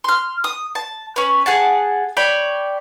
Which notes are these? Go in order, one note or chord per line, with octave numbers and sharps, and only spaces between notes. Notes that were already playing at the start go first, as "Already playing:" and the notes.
C6 F6
D#6
A5
C#4 B4
G#4 F#5 A5
C#5 D5 G5 B5